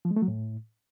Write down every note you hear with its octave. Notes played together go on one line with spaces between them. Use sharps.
F3
G#3
A3
F#3
A2